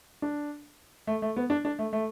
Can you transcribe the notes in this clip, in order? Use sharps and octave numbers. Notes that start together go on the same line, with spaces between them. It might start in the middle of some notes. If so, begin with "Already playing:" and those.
D4
A3
A3
B3
D4
D4
A3
A3